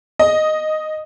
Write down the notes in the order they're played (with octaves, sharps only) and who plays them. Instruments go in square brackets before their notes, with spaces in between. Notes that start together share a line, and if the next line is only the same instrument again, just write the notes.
[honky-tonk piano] D#5